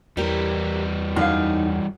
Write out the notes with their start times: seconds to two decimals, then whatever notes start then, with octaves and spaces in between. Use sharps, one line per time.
0.17 E2 E3 G3 G4 A#4
1.16 F#2 D#4 F5